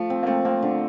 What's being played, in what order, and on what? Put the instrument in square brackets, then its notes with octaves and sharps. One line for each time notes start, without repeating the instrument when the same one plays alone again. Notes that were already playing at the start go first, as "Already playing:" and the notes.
Already playing: [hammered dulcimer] F3 [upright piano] A3
[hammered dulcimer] C4
[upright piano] A#3
[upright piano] A3 [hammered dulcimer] C4
[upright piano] A#3 [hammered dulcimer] C4
[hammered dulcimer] D3